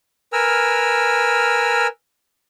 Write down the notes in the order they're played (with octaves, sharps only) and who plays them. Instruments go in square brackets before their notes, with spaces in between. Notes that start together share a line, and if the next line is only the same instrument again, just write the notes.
[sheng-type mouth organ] A#4 B4 G#5 E6 F6